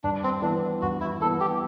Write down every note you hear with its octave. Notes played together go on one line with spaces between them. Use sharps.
G2 D4
C4
E3 B3 D4
G2 F#4
E4
E3 B3 A4
G4